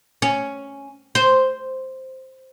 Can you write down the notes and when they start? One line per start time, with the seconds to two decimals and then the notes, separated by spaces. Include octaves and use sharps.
0.22 C#4
1.15 C5